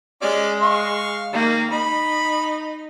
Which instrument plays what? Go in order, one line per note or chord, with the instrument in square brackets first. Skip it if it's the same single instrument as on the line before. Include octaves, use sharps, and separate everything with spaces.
[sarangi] G#3 [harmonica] C#4 D5
[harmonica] F5 C#6
[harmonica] D#3 [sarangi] A#3
[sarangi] D#4 [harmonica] B5